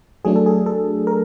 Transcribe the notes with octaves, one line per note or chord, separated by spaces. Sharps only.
F#3 A3 D4 G#4
A4
G#4
A4
A#4